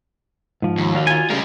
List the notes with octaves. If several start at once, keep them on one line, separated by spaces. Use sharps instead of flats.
G#2 F3
D#2
F#4 D5 F5
F4 G#5
C#3 G3 C#4 G#4 A#4